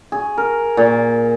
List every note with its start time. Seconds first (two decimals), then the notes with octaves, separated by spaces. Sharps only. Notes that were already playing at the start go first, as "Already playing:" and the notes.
0.12 G#4
0.38 A#4
0.77 A#2